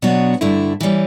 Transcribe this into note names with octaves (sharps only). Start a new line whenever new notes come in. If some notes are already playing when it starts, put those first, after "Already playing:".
B2 F#3 B3 D4 F#4
G2 D3 A3 E4
E3 G3 C#4